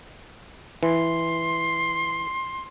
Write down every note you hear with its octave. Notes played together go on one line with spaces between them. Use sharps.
E3 C6